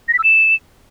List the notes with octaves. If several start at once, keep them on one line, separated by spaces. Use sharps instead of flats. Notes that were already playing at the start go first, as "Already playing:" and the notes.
A#6
B6
E6
E7